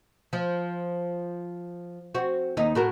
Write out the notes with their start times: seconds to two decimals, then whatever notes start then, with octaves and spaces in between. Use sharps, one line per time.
0.33 F3
2.15 C4 F#4
2.57 D#2 D#4
2.75 A2 F#4 A#4